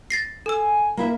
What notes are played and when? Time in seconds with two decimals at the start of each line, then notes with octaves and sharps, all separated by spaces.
0.10 A6 A#6 C7
0.46 A4 G#5 E6
0.97 A#3 E4 E5